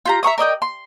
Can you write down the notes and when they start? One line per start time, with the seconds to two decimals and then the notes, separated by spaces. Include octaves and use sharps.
0.06 F4 G4 A#5
0.23 E5 A#5 C#6 D#6
0.38 A#4 D5 D#5 G5
0.62 C6